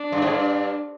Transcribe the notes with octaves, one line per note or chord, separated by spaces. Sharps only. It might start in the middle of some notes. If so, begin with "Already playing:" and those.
Already playing: D4
G2
G#2
G2